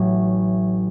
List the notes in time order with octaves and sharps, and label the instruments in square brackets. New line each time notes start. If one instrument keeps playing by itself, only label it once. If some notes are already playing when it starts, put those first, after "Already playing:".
Already playing: [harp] A1 A2 F#3